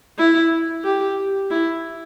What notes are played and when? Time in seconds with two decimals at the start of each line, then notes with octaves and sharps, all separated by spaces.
0.18 E4
0.85 G4
1.51 E4